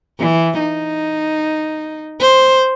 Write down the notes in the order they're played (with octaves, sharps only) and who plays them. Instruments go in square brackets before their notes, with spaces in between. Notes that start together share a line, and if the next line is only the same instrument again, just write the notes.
[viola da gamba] E3
D#4
C5